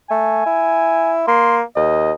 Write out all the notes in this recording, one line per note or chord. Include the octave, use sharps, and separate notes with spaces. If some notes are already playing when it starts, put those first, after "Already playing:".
A3 G#5
E4
A#3 C6
D#2 D#5